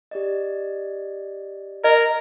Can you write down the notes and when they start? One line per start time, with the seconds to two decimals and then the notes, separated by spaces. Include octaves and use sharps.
0.11 G4 D5 D#5
1.84 A#4 D#5